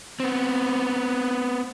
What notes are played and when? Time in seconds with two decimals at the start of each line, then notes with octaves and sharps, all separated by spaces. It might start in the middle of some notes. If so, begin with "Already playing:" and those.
0.20 B3 C4